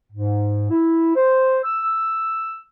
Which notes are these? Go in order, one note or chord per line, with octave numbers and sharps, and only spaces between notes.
G#2
E4
C5
E6